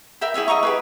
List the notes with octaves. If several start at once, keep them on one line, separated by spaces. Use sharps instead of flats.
A#4 E5 G5 B5
E4 G#4 C#5 E5
D#5 F#5 A#5 C#6
G4 G#4 B4